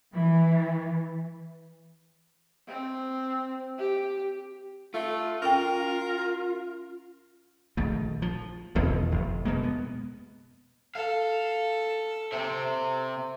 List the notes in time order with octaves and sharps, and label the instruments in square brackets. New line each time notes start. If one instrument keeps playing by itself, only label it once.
[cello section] E3
[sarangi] C4
G4
[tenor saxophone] A3 [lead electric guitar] F4
[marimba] C#4 G5 [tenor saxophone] A#4
[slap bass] A#1 D#3 A3
F3
F1 E2 B2 D#3
F1
B2 G#3 A#3
B3
[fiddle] A4 [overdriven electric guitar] F5
[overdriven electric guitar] C3 C4